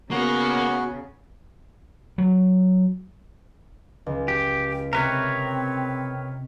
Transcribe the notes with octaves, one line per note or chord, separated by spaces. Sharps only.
C#3 A#3 B3 F#4
F#3
C#2
G4
C3 C4 G4 A#4 B4 C#5